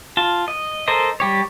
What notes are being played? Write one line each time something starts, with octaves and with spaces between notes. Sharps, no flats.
F4 A5
D#5
A4 A#4 C5 D#5
G3 G4 C#5